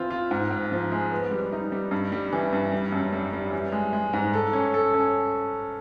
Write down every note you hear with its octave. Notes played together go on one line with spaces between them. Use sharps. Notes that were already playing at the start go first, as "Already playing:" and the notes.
Already playing: E3 B3 C4 F4
F4
G#2
G#2
F3
G#3
B3
G3
D#4
G3
G2
G3
E3
G2
G3
F#2
G3
G3
E3
G#3
G#3
G#2
A4
C#4
A4
C#4